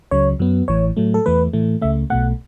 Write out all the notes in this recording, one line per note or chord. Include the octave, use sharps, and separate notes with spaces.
C#2 C#3 F#3 C#5
F#2 F#3 B3
A1 A2 E3 C#5
A2 F#3 A3
A4
E2 E3 A3 B4
A2 E3 A3
C#2 C#3 A3 E5
B1 B2 A3 F#5